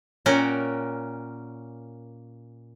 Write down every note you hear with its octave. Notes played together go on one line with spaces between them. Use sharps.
A#2 A#3 C#4 A#4 F#5 G5